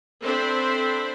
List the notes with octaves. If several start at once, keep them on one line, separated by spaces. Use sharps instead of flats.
C4 D4 A4 C5 E5 B5